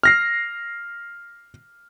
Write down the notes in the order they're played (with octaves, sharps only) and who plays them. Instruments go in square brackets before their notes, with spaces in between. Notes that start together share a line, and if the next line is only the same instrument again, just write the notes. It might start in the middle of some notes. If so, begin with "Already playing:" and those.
[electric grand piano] F6 A#6 C7